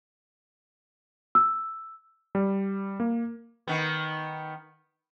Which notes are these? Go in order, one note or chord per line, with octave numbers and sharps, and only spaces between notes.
E6
G3
A#3
D#3 B3